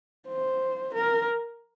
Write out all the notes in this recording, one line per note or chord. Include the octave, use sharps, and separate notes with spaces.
C5
A#4